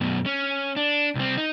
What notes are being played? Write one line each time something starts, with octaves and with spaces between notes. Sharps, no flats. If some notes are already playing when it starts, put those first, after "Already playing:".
F#2 B2
C#4
D4
C2 C4
D#4